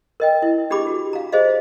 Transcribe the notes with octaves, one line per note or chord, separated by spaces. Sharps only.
A#4 D#5 G5
E4
D4 G4 G#4 B5 D6
F#4
F5 A#5
G#4 C5 D#5 F5